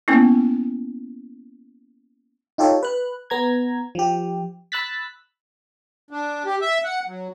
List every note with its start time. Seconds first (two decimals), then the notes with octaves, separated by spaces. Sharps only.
0.08 A#3 B3 C#4 E4
2.58 D#4 F4 G4 A4 C#5
2.83 B4 F#6
3.30 B3 A#5 G#6
3.95 F3 G4
4.72 B5 E6 F#6 A6 B6
6.11 D4
6.45 G4
6.61 E5
6.84 F#5
7.07 F#3